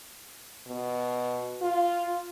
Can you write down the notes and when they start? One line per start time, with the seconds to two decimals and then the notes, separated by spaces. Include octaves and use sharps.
0.68 B2
1.61 F4